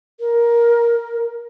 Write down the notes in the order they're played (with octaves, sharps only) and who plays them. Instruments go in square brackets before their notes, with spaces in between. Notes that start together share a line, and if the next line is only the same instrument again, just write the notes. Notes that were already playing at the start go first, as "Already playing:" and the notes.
[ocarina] A#4